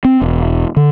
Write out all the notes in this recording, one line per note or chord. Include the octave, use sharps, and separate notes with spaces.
C4
E1
D3